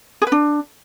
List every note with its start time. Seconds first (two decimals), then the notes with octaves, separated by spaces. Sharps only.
0.22 G#4
0.27 B4
0.32 D4